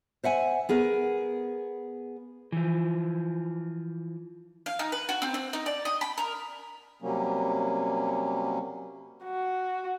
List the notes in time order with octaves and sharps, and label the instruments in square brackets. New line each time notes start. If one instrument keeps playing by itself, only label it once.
[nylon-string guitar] C5 E5 F#5 G#5
B3 G#4 A#4 B4
[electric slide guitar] E3 F3
[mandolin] F5
D#4
B4
F#4
C4
C4
D#4
D5
D#5
B5
A#4
[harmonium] C3 F#3 G3 A#3 C#4
[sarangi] F#4